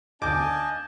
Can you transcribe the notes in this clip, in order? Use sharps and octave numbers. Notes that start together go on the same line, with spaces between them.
D2 D4 D#5 F5 G#5 A5 D6 G6